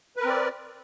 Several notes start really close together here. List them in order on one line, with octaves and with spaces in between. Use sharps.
B4 A#4 C4 D5